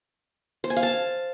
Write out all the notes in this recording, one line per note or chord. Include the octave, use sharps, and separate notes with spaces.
C5
G#5
F5
A5